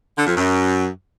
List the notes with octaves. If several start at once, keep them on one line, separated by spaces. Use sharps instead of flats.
D3
F2
F#2